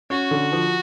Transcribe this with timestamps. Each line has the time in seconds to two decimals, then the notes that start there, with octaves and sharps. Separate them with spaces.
0.10 C#4 F#4
0.31 D3
0.52 F3